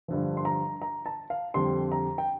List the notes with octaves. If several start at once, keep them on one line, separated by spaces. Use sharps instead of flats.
G2 D3 F3
C6
A#5
A#5
A5
F5
F2 D3 G3 C6
A#5
G5